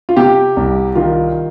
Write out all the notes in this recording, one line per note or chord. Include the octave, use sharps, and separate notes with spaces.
F4
C3 G4
C2
D#3 F4